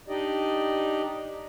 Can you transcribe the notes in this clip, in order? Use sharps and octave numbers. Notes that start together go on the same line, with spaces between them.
D4 D#4 G4 D5 D#5